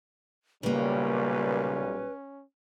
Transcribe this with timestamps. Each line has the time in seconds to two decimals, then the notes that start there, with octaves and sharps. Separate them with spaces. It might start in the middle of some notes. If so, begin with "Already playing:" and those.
0.63 B1 A#2 C#3 G3 A#3 C#4 B4